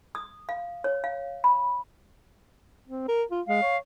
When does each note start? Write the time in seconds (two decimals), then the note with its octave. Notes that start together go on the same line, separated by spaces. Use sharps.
0.15 D#6
0.49 F5
0.84 C#5
1.04 F5
1.44 B5
2.88 C4
3.08 A#4
3.31 F4
3.47 G#3 F5
3.62 C#5